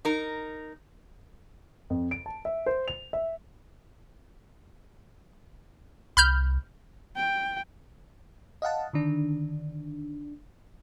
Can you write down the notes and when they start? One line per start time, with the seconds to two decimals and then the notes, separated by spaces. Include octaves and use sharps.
0.05 D#4 A#4
1.90 F2
2.11 D7
2.26 A5
2.45 E5
2.66 C5
2.88 F7
3.13 E5
6.17 C2 B5 F6 G6
7.17 G5
8.62 D#5 F5 F#5 A5
8.93 D3 D#3 D4